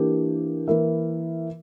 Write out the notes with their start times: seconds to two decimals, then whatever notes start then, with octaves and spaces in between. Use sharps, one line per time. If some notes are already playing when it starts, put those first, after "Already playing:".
Already playing: E3 A#3 D4 G4
0.68 E3 A#3 E4 A#4 E5